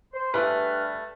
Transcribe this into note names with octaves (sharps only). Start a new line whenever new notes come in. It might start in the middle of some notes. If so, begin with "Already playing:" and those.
C5
G2 A3 G#4 B4 F6